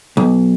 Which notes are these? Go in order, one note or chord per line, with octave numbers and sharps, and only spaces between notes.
B1